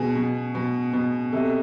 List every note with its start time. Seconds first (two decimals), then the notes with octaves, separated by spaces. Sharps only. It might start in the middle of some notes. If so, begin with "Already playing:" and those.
Already playing: B2 G#4
0.16 B2
0.55 B2
0.94 B2
1.33 C3 A4